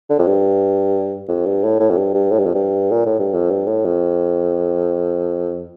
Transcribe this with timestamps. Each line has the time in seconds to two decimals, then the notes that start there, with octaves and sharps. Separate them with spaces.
0.10 D3
0.19 F2
0.27 G2
1.29 F2
1.46 G2
1.64 A2
1.80 A2
1.90 F2
1.97 G2
2.14 G2
2.31 A2
2.39 G2
2.46 F2
2.54 G2
2.91 A#2
3.06 A2
3.19 G2
3.34 F2
3.50 G2
3.67 A2
3.85 F2